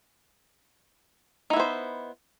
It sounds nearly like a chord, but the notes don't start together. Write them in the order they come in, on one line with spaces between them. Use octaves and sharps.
D#4 E4 B3 C5